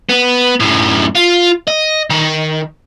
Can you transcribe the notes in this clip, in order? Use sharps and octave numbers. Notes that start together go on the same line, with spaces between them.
B3
F#2 A2
F4
D#5
D#3